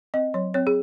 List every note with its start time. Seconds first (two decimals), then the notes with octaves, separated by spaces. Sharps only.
0.14 C4 D#5
0.34 F#3 C#5
0.54 C4 C#5
0.67 G#4